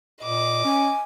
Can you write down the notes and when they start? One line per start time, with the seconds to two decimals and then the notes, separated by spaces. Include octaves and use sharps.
0.23 A#2 D#5 D6
0.64 C#4 G#5